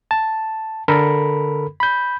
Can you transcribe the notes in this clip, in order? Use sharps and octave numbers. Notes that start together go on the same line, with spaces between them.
A5
D3 A4 A#4 B5
B5 G6